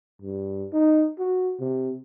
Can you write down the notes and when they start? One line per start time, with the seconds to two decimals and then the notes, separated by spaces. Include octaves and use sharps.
0.22 G2
0.73 D#4
1.19 F#4
1.60 C3